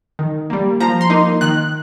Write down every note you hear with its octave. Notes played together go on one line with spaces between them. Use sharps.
D#3
G3 A#3
F3 A#5
C6
A#3 D#4
D#3 F#6